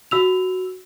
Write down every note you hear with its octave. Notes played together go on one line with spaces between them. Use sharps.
F#4 E6 F7